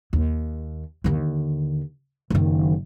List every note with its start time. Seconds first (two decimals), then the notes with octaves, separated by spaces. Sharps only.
0.13 D#2
1.04 D#2 D3
2.30 F#1 D#3